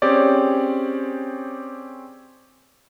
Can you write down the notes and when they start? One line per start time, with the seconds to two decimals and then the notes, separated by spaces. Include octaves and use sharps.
0.02 C4 C#4 G4 G#4 C#5 D5